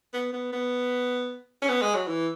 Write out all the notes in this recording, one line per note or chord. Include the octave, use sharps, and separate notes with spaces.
B3
B3
B3
C#4
B3
G#3
F#3
E3